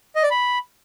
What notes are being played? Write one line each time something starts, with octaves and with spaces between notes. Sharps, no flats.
D#5
D5
B5